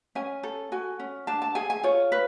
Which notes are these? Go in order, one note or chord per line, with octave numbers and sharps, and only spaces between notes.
C#4 G#5
A4
F#4 G#5
C#4
D4 A5
A5
G#4 G#5
G#5
F4 C#5
B4